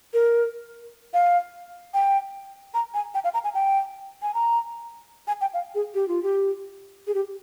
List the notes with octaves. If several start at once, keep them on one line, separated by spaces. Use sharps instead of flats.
A#4
F5
G5
A#5
G#5
G5
F5
A#5
G#5
G5
G#5
A#5
G#5
G5
F5
G#4
G4
F4
G4
G#4
G4